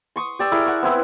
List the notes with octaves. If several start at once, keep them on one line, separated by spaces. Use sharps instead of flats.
C6 C#6 D#6
G4 D5 E6
E4 G#4 A#4
F#5 C#6
B3 C4 E4 B4